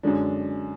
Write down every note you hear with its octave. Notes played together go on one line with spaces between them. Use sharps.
F#2 D3 G#3 D4